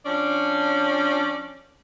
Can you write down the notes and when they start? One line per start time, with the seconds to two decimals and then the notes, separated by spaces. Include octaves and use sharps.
0.06 F3 C#4 D4